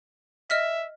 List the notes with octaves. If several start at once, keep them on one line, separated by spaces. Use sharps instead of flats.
D#5 E5 F6 B6